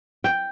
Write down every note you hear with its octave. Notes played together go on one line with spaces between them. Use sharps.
G5